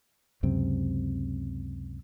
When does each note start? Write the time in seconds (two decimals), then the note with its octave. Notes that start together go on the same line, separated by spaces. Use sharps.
0.43 C#2 F#2 C3 C4